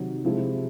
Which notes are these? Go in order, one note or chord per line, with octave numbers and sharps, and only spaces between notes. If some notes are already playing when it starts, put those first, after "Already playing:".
Already playing: C3 D#3 F#3
C3 F3 G#3 E4